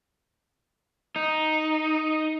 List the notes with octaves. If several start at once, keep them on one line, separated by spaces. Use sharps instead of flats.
D#4